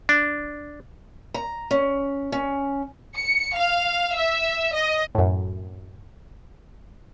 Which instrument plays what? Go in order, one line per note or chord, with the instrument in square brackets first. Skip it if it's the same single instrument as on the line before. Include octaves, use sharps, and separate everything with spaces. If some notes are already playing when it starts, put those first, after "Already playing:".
[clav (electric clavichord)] D4
[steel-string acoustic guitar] A#5
C#4
C#4
[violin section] C#7
F5
E5
D#5
[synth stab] F#2 A2